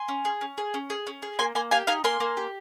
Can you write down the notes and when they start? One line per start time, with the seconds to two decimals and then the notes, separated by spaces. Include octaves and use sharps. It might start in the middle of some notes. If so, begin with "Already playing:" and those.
Already playing: G#5 C6
0.08 C#4
0.25 G#4
0.41 C#4
0.58 G#4
0.74 C#4
0.90 G#4
1.07 C#4
1.22 G#4
1.39 A#3 G#5 C6
1.55 A#3 G#5 C6
1.71 G4 F5 G#5
1.87 D#4 F5 G#5
2.04 A#3 G#5 C6
2.20 A#3
2.37 G4